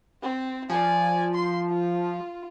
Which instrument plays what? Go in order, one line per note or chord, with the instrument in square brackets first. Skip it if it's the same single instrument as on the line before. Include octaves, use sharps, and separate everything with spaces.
[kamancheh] C4
[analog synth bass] F3 [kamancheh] D5 G#5
[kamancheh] C6
F4